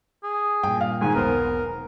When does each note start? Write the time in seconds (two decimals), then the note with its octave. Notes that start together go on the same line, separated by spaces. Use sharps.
0.23 G#4
0.63 G2 A#2 G5
0.81 F5
1.01 G#2 D#3 G#5
1.15 E1 B1 B3 A#4 C5